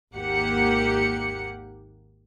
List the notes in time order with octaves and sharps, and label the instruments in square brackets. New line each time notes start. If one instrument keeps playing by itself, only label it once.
[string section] G#1 D#2 A#3 G4 F#5 C#7